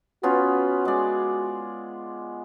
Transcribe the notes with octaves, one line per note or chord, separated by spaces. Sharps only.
B3 C#4 F4 F#4
G#3 D5